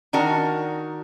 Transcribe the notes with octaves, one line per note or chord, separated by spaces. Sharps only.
D#3 D4 F#4 A#4